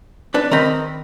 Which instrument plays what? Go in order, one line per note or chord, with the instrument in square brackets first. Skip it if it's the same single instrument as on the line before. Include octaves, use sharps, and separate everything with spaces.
[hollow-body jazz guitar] D4 B4
[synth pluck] D#3 C4 [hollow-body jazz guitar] A#4 D#5 B5